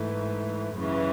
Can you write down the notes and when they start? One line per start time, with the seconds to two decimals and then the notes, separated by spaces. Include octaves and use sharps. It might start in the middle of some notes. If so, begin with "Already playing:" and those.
Already playing: G#2 E3 A3
0.76 F#2 C#3 E3